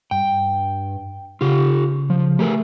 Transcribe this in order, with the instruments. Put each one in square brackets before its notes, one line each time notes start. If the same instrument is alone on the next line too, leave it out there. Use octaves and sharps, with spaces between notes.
[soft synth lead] G2 [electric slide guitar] G5
[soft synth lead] C#3 [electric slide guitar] F4 G4
[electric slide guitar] F3
[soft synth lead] A3 [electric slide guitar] G4 G#4 A#4